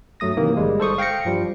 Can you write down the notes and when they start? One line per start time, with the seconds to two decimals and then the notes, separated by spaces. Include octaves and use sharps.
0.20 G2 F#3 A3 D#6 A#6
0.37 C3 D#3 E3 A#3
0.57 G1 G3 G#3
0.80 A4 C5 C#6 D#6
0.98 F5 G5 G6 A#6 C#7
1.25 G2 F3 G3